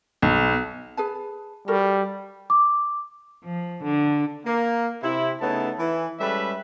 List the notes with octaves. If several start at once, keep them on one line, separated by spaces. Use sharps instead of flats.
B1
G#4 B4 A5
G3 F#4 A4 A#4
D6
F3
D3
A#3
C3 E4
C#3 A3 B3 D#4 E4 A5
E3 E4
G3 G#3 C#4 A4 B4 E5